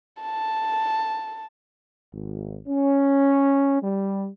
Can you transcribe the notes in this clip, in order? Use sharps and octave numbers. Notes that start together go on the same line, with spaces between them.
A5
G#1
C#4
G3